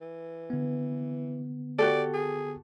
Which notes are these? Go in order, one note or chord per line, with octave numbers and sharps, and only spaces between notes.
E3
D3 B3
F#4 G4 A4 D5
G#4